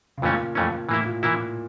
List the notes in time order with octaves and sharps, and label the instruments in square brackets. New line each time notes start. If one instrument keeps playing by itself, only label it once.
[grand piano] C#3
[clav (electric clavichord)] F2 E3 A3 C#4 [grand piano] A#2
[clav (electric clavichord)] F2 E3 A3 C#4
[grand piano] A2 [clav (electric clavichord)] E3 A#3 E4
[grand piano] A#2
[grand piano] A#2 [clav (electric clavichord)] E3 A#3 E4